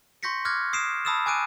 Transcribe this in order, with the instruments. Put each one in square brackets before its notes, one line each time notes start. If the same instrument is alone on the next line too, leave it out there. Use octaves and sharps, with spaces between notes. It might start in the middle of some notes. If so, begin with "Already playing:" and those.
[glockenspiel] C6 C#6 G6 A#6 B6 C#7
D6 F6 F#6 G#6 A#6
D#6 C7 D7 E7
A5 B5 D#6 E6 A6 E7
G#5 D6 F#6 D7 D#7